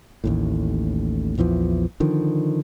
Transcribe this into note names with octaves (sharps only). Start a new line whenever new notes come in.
A1 D#2 A2
A#1 E2 E3 F3
D3 D#3 F3